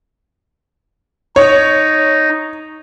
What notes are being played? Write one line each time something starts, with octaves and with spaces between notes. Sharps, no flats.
D#4 C#5